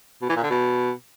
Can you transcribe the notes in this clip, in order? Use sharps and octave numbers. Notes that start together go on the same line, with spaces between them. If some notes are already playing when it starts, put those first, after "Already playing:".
B2
E3
A#2
D3
B2